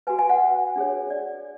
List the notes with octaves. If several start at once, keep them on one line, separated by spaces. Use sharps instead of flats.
F#4 B4 G#5
G#5
F#5
D4 G#4 C#5
D5